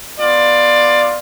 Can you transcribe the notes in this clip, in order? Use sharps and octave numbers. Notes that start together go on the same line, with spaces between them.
B3 F4 D5